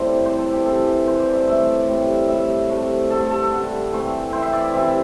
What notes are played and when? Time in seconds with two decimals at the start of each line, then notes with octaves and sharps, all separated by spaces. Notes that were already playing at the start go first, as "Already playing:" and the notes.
Already playing: A2 G3 C4 E4 G4 A4 C5 D5
0.25 E3 C4 E4 C5
0.39 A4
0.53 G4
0.66 E3 C4 E4 A4
1.07 G2 E3 G3 C5
1.20 D5
1.34 E5
1.47 A2 A3 E4 E5
1.88 A2 G3 C4 E4
2.29 A2 G3 D4 E5
2.69 C3 A3 D4
3.10 G2 D3 A3 A4
3.30 A4
3.51 D3 G3 D4
3.92 E3 A3 C4
4.32 E3 C4 E4 C5
4.42 E5
4.53 D5
4.73 C3 E3 C4 E4 E5